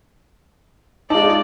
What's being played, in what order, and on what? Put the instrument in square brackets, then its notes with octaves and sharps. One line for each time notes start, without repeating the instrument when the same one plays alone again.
[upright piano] G#3 A5 [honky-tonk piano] D#4 F4 [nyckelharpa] D5